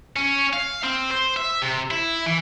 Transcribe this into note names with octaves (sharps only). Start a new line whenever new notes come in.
C#4
F5
C4
C5
E5
C3
E4
E3